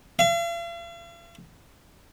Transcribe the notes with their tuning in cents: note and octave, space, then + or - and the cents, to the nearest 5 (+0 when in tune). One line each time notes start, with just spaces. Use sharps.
F5 -45